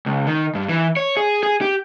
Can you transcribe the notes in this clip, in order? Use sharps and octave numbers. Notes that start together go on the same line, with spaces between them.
C#2
D#3
G2
E3
C#5
G#4
G#4
G4